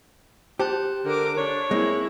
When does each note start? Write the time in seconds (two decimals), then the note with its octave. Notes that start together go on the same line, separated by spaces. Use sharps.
0.59 G4 C5 A5 F#6
1.05 D3 A#4 D6
1.37 D4 C#5
1.71 G#3 A#3 C4 E4